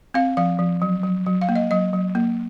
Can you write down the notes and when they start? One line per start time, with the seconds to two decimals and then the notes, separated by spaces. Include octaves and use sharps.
0.14 C4 F5
0.37 F3 F5
0.59 F3
0.82 F#3
1.03 F#3
1.26 F#3
1.41 F5
1.49 A#3
1.55 D#5
1.71 F#3 D#5
1.93 F#3
2.15 A#3